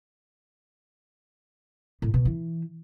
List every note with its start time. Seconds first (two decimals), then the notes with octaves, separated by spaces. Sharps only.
2.02 A2
2.14 B2
2.25 E3